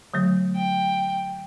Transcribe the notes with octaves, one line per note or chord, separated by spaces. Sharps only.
D3 F#3 A3
G5